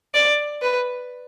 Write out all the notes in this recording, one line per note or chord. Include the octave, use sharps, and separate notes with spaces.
D5
B4